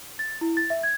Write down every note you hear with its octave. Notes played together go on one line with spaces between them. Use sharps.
A6
E4
A6
E5
G#6